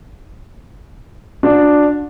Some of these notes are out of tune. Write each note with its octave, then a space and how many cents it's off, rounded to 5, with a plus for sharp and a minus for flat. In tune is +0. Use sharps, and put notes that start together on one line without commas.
D4 +0 F#4 -40